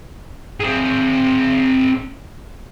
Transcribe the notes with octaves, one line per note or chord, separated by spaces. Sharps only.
C4 G#4